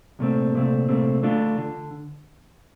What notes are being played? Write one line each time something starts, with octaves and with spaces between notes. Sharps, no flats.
C2 A#2 A3 C4
C2 A#2 A3 C4
C2 A#2 A3 C4
D3 A3 D4 F4
D3